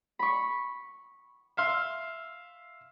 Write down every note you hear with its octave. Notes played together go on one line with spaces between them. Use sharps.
B5 C#6
E5 F5 C6